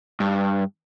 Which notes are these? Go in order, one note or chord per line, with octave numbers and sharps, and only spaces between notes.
G2